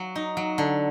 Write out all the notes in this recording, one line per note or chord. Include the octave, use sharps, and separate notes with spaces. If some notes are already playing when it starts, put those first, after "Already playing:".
Already playing: F#3
D#4
F#3
D3